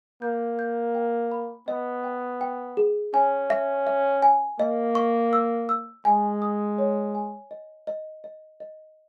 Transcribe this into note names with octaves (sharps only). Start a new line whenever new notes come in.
A#3 G6
G6
G5
B5
B3 D#5
G5
G5
G#4
C#4 G#5
E5
E5
G#5
A#3 D#5
C#6
E6
E6
G#3 G#5
D#6
C#5
G#5
D#5
D#5
D#5
D#5